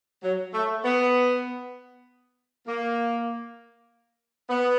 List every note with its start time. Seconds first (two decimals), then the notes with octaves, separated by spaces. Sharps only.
0.23 F#3
0.54 A3
0.84 B3
2.67 A#3
4.50 B3